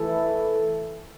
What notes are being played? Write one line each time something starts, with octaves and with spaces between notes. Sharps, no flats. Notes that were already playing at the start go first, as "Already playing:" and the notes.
Already playing: E3 A3 E4 A4